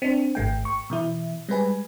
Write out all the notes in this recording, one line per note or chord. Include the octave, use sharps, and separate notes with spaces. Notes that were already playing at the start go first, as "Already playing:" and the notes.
C4 D4
G#1 A3 G5
C#6
B2 E3 E4
G3 G#3 B4 G#5